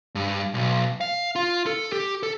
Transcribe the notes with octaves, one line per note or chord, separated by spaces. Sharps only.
G2
B1
F5
F4
A4
G4
A4